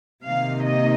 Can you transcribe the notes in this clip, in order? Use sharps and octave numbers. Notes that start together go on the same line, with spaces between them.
C3 D#3 A#3 D#4 F5
D#5